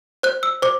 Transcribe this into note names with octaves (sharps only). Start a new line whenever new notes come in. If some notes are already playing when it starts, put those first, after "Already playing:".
C5 F#6
E6
C5 D6